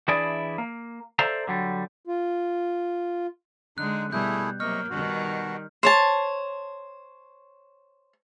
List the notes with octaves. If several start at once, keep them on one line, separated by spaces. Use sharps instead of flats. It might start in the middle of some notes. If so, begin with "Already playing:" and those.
E3 D4 E4 G#4 D5
A#3
A4 C5 D5 E5 F5 A#5
D3 F#3 G3
F4
D3 G#3 D#4 F#6
B2 G3 A3 E4 G#4 G6
C3 F#3 A#3 D#5 C#6 F6
B2 D#3 G3 F#4
C5 C#5 A5